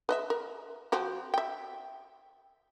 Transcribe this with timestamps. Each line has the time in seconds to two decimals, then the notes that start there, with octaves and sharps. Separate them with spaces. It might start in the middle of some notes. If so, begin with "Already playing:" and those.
0.09 B4 D#5 E5
0.30 A#4
0.92 F3 C4 F#4
1.34 E5 G5